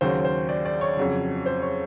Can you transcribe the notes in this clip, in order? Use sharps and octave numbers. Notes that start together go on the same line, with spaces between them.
D#2 C#3 F#3 C5
C5
D5
D5
C#5
F2 C#3 F#3
C5
C#5